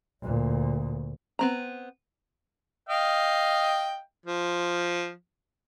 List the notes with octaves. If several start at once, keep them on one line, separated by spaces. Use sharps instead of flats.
D2 A#2
B3 C4 A#5
D#5 F5 G5
F3